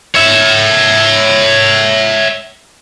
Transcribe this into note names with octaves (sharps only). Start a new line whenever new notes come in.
C#5 E5